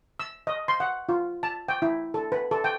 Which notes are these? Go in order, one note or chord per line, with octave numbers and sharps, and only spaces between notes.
E6
D#5
C6
F#5
F4
A5
G5
E4
A4
B4
A4
G5